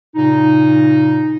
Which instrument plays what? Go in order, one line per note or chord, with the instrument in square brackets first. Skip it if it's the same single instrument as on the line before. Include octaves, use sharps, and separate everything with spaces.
[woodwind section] A#2 C#3 D#4